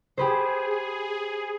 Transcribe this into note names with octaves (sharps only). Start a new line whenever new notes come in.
G4 G#4 B4 C5